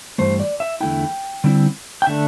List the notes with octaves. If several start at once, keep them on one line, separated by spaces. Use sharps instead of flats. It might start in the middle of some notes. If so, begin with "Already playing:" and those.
G2 E3 A3 C5
D5
E5
E2 D3 A3 E4 G5
D3 G3 C4 E4
G5
D3 A3 D4 E5